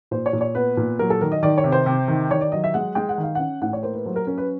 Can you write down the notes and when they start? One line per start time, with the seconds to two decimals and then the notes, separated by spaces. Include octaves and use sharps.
0.11 A#2 C5
0.26 C#5
0.33 A#2
0.41 C#5
0.55 B3 B4
0.77 A#2
0.99 F#3 A#4
1.10 A4
1.21 D#3 A#4
1.32 D#5
1.43 D#3 D5
1.58 C#5
1.64 C3
1.72 C5
1.86 C3
2.08 D#3
2.31 D#3 C#5
2.41 D5
2.52 F#3 D#5
2.64 E5
2.74 G#3 F#5
2.95 G#3 G5
3.09 F#5
3.18 D#3
3.23 F5
3.35 C#4 F#5
3.62 A2 F#5
3.73 C#5
3.83 A#3 C5
3.94 B4
4.06 F#3 C5
4.16 A#4
4.27 C#4 A#4
4.38 B4